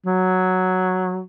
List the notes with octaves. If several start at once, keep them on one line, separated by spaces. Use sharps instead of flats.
F#3